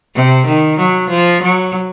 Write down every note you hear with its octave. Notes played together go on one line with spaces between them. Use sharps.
C3
D#3
F#3
F3
F#3